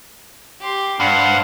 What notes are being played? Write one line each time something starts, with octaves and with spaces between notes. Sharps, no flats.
G4 C6
G2 D4 C5 F5 F#5